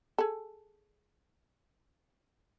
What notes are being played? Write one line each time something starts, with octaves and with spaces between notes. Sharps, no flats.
G#4 A4